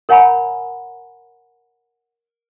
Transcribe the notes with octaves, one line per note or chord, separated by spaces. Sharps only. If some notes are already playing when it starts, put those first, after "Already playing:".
A#4 C#5 F#5 G#5 A#5 B5